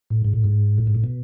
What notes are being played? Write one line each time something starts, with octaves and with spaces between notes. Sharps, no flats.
A2
G#2
A2
G#2
A2
G#2
A2
B2